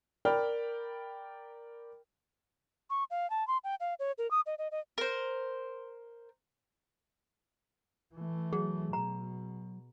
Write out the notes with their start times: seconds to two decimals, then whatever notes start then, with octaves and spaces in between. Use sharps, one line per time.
0.25 A#4 D5 G5 B5 F6
2.90 C#6
3.10 F5
3.30 A5
3.47 C6
3.64 G5
3.80 F5
3.99 C#5
4.18 A#4
4.31 D#6
4.46 D#5
4.58 D#5
4.71 D#5
4.98 A#4 C5
8.14 E3 A3
8.53 F#3 G#4
8.93 B2 A#5